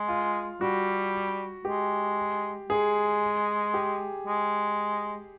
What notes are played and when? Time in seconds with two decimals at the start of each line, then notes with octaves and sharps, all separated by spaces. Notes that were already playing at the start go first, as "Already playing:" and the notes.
Already playing: G#3
0.08 F4
0.61 G3 F#4
1.65 G#3 G4
2.69 G#3 G#4
3.74 G4
4.27 G#3